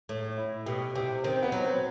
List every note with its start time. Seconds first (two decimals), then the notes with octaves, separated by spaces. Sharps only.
0.09 A2
0.37 E4
0.66 B2 G4
0.95 C3 G4
1.24 D#3 C4
1.43 B3
1.52 F#3
1.62 C4